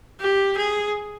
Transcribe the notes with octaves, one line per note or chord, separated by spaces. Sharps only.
G4
G#4